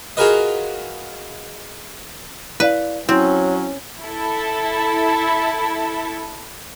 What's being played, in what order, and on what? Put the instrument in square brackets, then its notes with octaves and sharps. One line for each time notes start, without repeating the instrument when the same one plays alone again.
[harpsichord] F4 F#4 G#4 A#4 B4 D#5
[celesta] E4 D5 F5 [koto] B4
[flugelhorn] F#3 [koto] C4 [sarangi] C#4 [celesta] E4
[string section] E4 A4